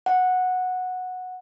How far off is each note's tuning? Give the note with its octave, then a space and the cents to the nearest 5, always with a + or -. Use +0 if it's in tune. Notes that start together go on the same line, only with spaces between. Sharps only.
F#5 -10